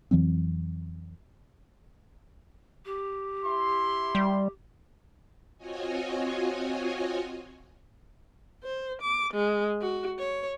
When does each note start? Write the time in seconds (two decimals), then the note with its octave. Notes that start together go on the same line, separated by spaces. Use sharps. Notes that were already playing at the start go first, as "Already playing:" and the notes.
0.11 F2 E3 F#3 C4
2.86 G4
3.45 E4 C6
4.15 G3
5.57 C4 F4 F#4 C#5 D#5 G#5
8.63 C5
9.02 D6
9.34 G#3
9.82 F#4
10.19 C#5